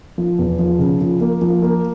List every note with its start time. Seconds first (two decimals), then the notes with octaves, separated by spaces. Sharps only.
0.18 F3
0.39 E2
0.59 F3
0.79 C#3
1.01 F3
1.21 A#3
1.41 F3
1.62 A#3